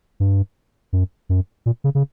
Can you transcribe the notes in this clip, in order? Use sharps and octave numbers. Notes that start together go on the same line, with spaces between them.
G2
F#2
F#2
A#2
C#3
C#3